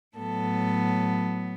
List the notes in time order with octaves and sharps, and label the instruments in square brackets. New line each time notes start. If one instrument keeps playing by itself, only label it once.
[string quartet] A2 F#3 B3 A4